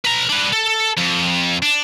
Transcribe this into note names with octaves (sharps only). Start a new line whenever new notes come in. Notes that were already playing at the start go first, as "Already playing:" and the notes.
B4 A#5
D4 B4
A4
F2
D4